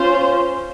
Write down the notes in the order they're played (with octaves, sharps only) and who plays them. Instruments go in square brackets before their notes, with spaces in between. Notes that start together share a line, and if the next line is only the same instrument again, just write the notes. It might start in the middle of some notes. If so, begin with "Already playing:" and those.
Already playing: [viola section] C#4 F4 C5